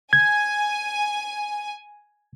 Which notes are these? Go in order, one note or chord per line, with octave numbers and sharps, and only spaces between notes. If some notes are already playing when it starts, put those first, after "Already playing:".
G#5 G#6